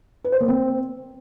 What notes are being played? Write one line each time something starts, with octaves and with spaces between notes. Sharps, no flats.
B4
C5
A#3
C4